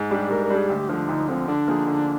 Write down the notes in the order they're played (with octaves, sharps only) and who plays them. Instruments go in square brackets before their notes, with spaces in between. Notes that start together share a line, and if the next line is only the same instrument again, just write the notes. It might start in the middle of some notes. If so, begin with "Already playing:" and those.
Already playing: [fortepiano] G#2
[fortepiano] G3 D4 [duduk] G4
[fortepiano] G#2 [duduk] A#4
[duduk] A#4
[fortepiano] G3 D4
[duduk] G#4
[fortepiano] D2 [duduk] G4
[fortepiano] D3 F3 [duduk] D4
[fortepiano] D2 [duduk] D#4
[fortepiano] D3 F3 [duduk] C4
[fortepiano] D3 [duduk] D4
[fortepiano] F3 A#3 D#4 G#4
D3